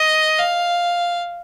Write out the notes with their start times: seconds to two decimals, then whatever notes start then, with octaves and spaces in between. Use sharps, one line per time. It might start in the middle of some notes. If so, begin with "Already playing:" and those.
Already playing: D#5
0.39 F5